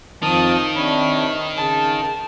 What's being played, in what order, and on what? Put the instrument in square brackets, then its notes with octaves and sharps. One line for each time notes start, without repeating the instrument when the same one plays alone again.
[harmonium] F2 F3 A5 [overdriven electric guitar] D#3 [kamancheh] D#6
[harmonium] C3 D4 C#5 [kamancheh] B5
[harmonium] C#3 [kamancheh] A5